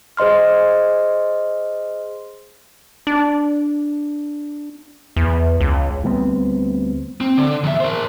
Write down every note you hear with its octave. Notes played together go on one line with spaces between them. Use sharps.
G#4 C5 D#5 C6 F6
D4
E2
C#2
D2 G3 B3 C4
C4
D3
E2 E5
A#4 C5